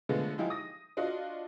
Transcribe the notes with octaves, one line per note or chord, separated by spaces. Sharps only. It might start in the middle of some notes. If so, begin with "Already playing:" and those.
D3 F3 G#3 A3 B3
F3 G#3 D#4 E4 G4 G#4
D#6 A#6
D4 F4 F#4 D#5